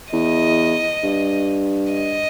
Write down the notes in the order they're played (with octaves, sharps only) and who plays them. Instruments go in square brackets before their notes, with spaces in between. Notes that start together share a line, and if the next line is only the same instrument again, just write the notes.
[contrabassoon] E2 [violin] D#5
[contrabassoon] G2
[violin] D#5